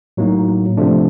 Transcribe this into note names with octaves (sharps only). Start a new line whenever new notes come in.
A2 F#3 A#3 D#4
C3 F3 A3 D4